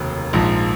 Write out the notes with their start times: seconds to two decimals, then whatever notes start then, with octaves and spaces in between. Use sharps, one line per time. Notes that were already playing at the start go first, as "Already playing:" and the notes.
Already playing: F1 D#2 C#3 F#3
0.33 A#1 G#2 F3